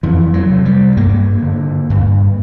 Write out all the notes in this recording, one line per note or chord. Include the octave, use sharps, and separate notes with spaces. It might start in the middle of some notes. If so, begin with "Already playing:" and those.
F2 E3
F#3
C3
G3
G2 A#3
D3
G2